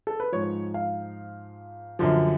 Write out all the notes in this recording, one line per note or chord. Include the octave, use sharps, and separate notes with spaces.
A4
B4
G#2 F3 C#5
F5
F#2 D3 F3